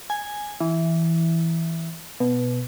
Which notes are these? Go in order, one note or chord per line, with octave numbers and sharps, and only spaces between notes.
G#5
E3
B2